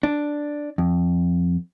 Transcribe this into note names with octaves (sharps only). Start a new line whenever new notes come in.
D4
F2